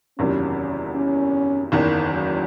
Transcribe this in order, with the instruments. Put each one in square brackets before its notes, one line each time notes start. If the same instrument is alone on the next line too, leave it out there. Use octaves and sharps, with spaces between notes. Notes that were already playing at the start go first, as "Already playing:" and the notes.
[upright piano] F#1 E2 C3 D#3 F#3 [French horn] C#4
[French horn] C#4
[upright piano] F#1 E2 D#3
[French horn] F#3